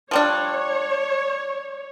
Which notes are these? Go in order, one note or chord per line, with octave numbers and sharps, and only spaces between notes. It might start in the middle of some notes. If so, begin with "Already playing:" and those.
F3 G3 D4 C#5